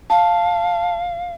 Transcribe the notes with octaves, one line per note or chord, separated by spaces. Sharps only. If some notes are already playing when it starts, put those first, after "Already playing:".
F5 A5